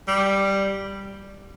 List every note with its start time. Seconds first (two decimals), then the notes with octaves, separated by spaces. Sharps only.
0.08 G3